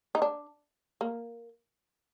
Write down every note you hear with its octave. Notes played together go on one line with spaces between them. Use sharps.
D#4
D4
A#3